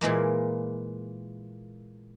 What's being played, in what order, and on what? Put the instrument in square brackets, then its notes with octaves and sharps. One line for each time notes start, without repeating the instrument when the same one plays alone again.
[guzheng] A#2 E3 G#3 A#3